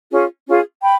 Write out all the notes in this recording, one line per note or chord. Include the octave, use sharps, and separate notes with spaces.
C#4 F4 G#4
C#4 F4 G#4
G5 B5